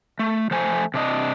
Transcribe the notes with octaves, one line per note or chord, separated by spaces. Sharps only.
A3
F3 A3 C5 G#5
C3 D4 D#5